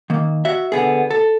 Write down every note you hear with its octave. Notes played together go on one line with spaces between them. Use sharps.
D#3 A#3
F#4 E5
D3 B3 G#4
A4